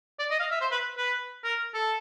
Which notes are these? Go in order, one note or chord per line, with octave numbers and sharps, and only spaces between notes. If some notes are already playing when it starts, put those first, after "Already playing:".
D5
D#5
F5
E5
C5
B4
B4
A#4
A4